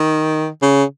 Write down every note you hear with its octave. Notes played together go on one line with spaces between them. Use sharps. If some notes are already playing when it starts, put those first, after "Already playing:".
Already playing: D#3
C#3